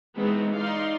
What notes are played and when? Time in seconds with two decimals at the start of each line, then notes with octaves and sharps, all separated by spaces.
0.18 E3 G#3 A3 B3 C4 D#4
0.55 D#4 D5 F5 C6